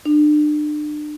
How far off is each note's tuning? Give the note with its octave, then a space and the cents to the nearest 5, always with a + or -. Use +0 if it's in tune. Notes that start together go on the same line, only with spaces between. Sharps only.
D4 +35